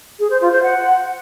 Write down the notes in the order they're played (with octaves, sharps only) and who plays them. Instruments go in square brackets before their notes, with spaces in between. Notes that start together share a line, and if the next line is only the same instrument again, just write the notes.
[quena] G#4
C5
F4
C5
F#5